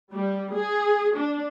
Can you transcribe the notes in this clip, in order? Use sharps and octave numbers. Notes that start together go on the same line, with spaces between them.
G3
G#4
D4